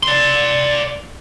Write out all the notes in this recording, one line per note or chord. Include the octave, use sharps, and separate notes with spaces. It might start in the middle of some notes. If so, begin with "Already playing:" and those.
D5 C6